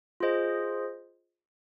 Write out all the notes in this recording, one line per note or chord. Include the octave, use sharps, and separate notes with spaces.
F4 G#4 C5 D#5